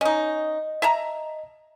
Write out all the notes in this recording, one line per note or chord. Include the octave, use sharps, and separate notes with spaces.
C#4 D#4 D#5
E5 A5 A#5